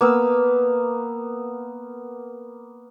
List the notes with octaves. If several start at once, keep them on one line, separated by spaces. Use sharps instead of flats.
A#3 B3 E6